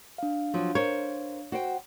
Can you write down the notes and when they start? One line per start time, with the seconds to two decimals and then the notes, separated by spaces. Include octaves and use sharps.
0.18 D4 F5
0.54 F3 F#3
0.75 A#4 C5 C#5
1.52 F#4 C5 G5